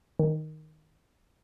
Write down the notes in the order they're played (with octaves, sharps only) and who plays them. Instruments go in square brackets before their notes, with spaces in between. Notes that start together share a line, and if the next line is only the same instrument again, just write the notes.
[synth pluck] D#3